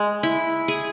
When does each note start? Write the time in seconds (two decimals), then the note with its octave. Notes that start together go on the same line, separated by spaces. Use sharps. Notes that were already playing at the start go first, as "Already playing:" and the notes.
Already playing: G#3
0.23 E4
0.68 G#4